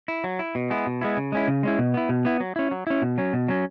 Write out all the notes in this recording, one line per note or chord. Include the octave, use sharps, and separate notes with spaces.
E4
F#3
E4
B2
G#3 B3 E4
B2
G#3 B3 E4
C#3
G#3 C#4 E4
C#3
G#3 C#4 E4
B2
B3 E4
B2
B3 E4
F#3
C#4 E4
F#3
C#4 E4
B2
F#3 C#4
B2
F#3 C#4